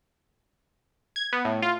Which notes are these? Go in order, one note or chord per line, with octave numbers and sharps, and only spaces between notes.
G#6
B3
A2
F4